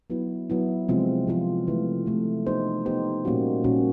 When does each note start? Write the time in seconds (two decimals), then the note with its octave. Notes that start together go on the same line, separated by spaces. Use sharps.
0.10 F#3 B3 E4
0.50 F#3 B3 E4
0.88 C3 F3 G#3 C4 F4
1.27 C3 F3 G#3 C4 F4
1.67 C3 E3 A3
2.06 C3 E3 A3
2.46 B3 D#4 G4 C5
2.85 B3 D#4 G4 C5
3.25 A#2 G3 A#3 C#4 F#4
3.64 A#2 G3 A#3 C#4 F#4